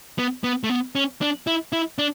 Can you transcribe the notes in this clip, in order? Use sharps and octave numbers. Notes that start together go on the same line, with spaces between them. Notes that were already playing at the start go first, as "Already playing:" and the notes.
B3
B3
A3
B3
C#4
D4
E4
E4
D4